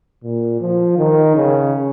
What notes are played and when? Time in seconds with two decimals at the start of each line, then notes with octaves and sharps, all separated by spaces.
0.24 A#2
0.60 F3
0.98 D#3
1.35 C#3